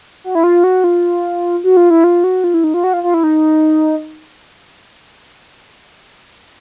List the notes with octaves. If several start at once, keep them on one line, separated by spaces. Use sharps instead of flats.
F#4
E4
F4
F#4
F4
F#4
F4
E4
F4
F#4
F4
E4
D#4
F4
F#4
F4
F4
E4
D#4